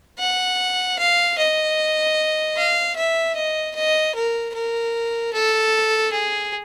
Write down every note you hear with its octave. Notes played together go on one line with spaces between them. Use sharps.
F#5
F5
D#5
F5
E5
D#5
D#5
A#4
A#4
A4
G#4